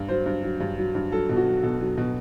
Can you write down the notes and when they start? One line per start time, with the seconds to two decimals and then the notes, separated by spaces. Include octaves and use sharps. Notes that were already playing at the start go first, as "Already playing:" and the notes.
Already playing: G2
0.09 F#3 C5
0.26 G2
0.43 F#3
0.60 G2
0.78 F#3
0.95 G2
1.12 F#3 A4
1.29 B2
1.37 F#4
1.46 F#3
1.63 B2 A4
1.80 F#3
1.97 B2